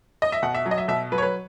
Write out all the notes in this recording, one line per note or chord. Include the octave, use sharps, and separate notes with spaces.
D#5
E5
B2 F#5
E5
F#3
D#5
E5
B2 E5
F#3 B4
C#5
B4